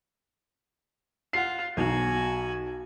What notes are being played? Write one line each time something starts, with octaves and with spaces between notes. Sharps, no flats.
F4 F#5 C7
B1 F#4 G#5